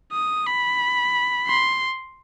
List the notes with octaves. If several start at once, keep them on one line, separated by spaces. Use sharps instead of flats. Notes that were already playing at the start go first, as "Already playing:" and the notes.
D#6
B5
C6